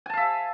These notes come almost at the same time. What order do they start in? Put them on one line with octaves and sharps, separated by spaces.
G#5 A5 F5 E5